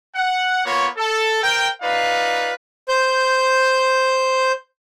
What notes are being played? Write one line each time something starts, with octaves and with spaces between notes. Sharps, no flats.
F#5
A#3 B3 F4 C#5
A4
A#4 C5 G5
D#4 F4 B4 D5 F5
C5 G6